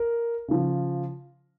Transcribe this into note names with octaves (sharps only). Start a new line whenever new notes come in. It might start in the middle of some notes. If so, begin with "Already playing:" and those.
Already playing: A#4
C#3 F3